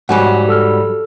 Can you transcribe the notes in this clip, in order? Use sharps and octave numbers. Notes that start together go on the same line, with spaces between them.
G#2 F#3 G3 F#5 G#5
A4 E6 F6